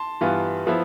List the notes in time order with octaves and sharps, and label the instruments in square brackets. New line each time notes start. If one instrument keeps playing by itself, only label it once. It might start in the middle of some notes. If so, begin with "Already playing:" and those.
Already playing: [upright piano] A5 C6
G2 E3 B3 F4
F3 B3 E4